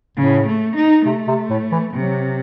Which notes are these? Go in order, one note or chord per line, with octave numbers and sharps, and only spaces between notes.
A2 C#3
A3
D#4
C3 A3
C3
A2
E3
C3 F#3